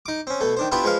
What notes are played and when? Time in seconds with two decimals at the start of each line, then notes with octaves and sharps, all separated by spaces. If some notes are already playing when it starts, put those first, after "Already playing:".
0.06 D#4 D6
0.27 C4 C#4
0.41 B2 A3
0.57 D#3 D4 C5
0.72 B3 D4 E4 F4 G4 B4
0.84 F3 G#3 B4 F5